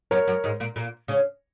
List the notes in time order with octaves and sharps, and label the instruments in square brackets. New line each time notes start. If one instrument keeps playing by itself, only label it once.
[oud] F#2 F#3 [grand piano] A#4 C#5
[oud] F#2 F#3
G#2 G#3
A#2 A#3
A#2 A#3
C#3 C#4